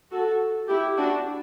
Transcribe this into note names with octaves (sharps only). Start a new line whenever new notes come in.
F#4 A4
E4 G4
D4 F#4